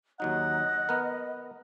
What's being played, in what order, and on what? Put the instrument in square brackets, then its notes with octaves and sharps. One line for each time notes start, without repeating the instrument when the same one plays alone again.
[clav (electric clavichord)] D#2 F#3 D#4 [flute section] D#5 [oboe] F#5
[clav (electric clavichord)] B3 A#4